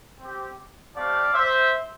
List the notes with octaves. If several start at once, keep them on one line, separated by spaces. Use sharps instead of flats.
C4 G4
A3 C4 G4 D5 F5
C5 E5